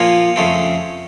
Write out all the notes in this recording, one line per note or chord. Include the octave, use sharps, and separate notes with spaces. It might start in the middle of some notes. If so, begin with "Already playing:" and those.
Already playing: A#2 F3 A#3 F4 C#5 F5
F2 C#3 A3 C4